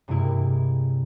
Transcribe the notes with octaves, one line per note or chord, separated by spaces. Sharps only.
G2 C3 G#3 A#3 E4